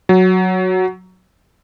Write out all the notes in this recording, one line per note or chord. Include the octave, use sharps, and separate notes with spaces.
F#3